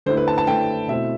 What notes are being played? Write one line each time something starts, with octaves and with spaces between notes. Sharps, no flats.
D3 A3 E4 C5
B4
A5
A5
D3 A3 E4 G5
B2 A3 C4 E4 E5